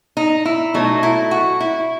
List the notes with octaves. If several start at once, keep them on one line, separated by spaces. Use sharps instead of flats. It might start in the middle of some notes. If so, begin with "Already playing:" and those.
D#4
E4
B2 F#3 A3 D#4
E4
F#4
E4